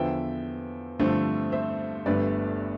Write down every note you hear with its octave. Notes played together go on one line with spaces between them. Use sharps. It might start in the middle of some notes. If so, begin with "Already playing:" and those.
Already playing: E2 D3 F3 B3 E5 G5
G2 D3 F3 A3 C4
C5 E5
G1 G2 D3 A3 B4 D5